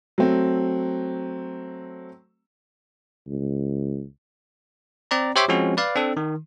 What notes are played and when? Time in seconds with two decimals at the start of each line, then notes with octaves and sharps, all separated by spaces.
0.18 F#3 A3 C4
3.27 C#2
5.11 C4 D5 A#5
5.36 G4 C5 C#5 E5 C6 D6
5.48 F3 G#3 C4 C#4 F#4
5.77 B4 D5 F5
5.96 C4 D4 A4
6.17 D#3